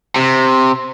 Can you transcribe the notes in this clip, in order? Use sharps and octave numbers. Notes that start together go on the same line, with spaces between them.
C3